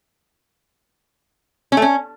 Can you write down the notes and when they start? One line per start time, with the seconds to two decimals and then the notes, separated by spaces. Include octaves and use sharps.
1.72 C#4
1.77 A3
1.82 C#4